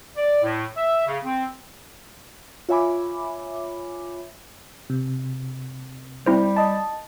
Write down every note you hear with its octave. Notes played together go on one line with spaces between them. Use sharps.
D5
A2
E5
C#3
C4
F4 C#5 E5 G#5 B5 D6
C3
G3 C4 E4 C5
D#5 A5